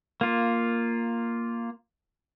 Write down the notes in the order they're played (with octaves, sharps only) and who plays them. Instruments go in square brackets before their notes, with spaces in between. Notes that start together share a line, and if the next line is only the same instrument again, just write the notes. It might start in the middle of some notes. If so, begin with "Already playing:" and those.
[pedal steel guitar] A#3 F4